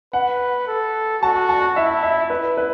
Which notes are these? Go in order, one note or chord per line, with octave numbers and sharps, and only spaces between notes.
B4 F#5
A4
F#4 A5
A5
E4 E5
E5
E4 B4
B4